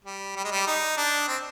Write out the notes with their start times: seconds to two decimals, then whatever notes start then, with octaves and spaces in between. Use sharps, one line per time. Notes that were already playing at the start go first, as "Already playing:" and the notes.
0.05 G3
0.36 G3
0.44 G#3
0.51 G3
0.67 D#4
0.97 D4
1.28 C4